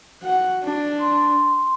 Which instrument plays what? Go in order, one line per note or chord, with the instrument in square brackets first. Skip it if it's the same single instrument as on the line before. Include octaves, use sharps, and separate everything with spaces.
[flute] F#4 [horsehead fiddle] F#5
[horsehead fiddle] D4
[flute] C6